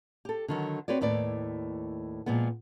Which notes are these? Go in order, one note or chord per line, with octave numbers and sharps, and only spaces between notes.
G4 A4
D3 D#3 F#3
C4 F#4 B4 C#5 D5
D#2 A2 B4 D5
A#2 F3 G#3 B3